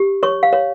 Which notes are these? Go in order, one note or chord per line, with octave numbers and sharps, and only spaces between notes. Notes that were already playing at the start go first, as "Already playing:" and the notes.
Already playing: G4
C#5 C#6
F5
C#5